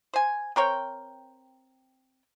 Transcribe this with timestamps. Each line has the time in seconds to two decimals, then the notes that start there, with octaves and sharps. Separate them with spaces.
0.14 C5 G#5
0.56 C4 A#4 C#5 G5